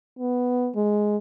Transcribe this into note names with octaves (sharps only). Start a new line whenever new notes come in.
B3
G#3